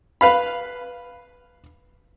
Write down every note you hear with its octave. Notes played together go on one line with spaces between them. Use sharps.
B4 F5 B5